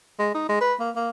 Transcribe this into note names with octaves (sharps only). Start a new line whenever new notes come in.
G#3
D#4
G#3
B4
A#3
A#3